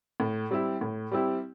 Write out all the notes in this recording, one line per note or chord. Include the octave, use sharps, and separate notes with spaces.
A2
G3 C4 E4 G4
A2
G3 C4 E4 G4